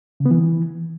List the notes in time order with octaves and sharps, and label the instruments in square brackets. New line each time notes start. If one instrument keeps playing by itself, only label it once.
[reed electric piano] C#3
B3
E3